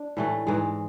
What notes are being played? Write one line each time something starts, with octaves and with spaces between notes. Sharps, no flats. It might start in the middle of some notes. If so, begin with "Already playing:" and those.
Already playing: D4
A2 E3 A3
G#2 E3 G#3